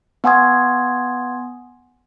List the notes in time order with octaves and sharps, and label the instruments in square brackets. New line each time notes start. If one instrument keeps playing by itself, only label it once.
[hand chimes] B3 F#5 G#5 C6 D#6 G#6